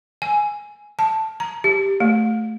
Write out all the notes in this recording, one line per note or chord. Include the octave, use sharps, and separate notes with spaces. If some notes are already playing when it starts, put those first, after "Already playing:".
G#5
A5
A#5
G4
A3